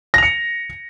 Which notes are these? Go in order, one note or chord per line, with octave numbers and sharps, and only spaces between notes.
A#6 C#7 F7